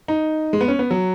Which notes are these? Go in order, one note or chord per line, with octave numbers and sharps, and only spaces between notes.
D#4
G#3
B3
C#4
B3
F#3